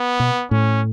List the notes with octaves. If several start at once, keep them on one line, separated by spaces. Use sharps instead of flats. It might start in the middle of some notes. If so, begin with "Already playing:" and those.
Already playing: B3
B2
A2 C#4